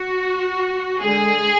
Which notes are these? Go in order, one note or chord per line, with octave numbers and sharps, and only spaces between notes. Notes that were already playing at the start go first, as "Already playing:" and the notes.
Already playing: F#4
D3 G#3 G#4